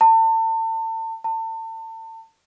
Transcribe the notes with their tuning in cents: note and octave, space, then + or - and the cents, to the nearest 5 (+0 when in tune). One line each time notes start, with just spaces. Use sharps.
A5 +35
A5 +35